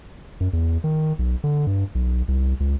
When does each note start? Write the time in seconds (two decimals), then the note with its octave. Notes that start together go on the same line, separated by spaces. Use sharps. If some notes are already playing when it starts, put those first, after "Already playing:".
0.40 F#2
0.53 E2
0.84 D#3
1.19 B1
1.44 D3
1.67 G2
1.95 B1
2.28 C2
2.60 C#2